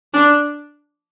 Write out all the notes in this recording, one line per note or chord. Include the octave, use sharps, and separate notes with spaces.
D4